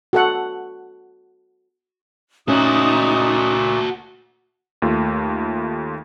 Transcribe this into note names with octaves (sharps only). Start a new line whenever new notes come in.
F#4 A4 F#5
A#2 A3 C#4 D#4 F#4 A4 D#6
D#2 A3 F4